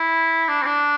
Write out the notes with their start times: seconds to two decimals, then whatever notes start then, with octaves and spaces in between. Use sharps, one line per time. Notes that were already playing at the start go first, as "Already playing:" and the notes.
Already playing: E4
0.48 D4
0.62 C4
0.66 D4